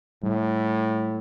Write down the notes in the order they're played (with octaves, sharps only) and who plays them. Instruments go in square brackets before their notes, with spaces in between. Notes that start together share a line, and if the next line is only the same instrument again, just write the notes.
[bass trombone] A2 [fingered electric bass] G3